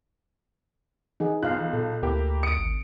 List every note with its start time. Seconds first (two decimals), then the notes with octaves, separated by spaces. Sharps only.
1.20 E3 D#4 G#4 F#5
1.43 B1 F4 F5 F#6
1.73 A#2 A4
2.03 D2 A#3 E4 G4
2.43 D#6 C#7 D7
2.59 G#1